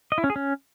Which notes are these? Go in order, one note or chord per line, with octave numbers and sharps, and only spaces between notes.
D#5
E4
C#4
G#4
C#4